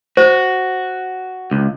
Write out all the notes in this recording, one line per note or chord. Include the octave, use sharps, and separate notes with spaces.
F#4 C5
C#2